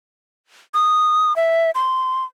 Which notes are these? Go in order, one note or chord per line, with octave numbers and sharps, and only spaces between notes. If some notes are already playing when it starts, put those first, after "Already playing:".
D#6
E5
C6